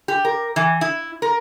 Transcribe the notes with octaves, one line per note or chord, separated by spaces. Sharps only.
G4
A#4
E3
E4
A#4